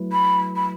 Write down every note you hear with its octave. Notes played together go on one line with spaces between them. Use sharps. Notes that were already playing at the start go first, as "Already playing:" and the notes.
Already playing: F#3 A3 E4 B4
B5
B5